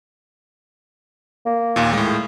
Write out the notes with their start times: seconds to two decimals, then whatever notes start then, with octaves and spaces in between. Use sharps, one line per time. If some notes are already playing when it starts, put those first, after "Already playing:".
1.46 A#3
1.76 D#2 A#2
1.93 A2 G#3